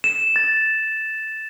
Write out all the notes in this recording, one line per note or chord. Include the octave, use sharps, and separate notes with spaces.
E7
A6